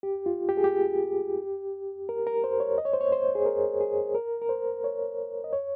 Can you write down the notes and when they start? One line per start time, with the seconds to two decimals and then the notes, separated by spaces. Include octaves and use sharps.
0.03 G4
0.26 F4
0.49 G4
0.57 G#4
0.64 G4
2.09 A#4
2.27 A#4
2.44 C5
2.60 C#5
2.78 D#5
2.85 C#5
2.93 C5
3.01 C#5
3.12 C5
3.35 G#4
3.46 A#4
3.80 G#4
4.15 A#4
4.42 A#4
4.49 C5
4.84 C#5
5.44 D#5
5.53 C#5